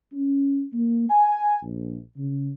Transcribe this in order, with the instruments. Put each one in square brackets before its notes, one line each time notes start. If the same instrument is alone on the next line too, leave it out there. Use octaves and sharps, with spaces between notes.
[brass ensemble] C#4
A#3
G#5
A#1
C#3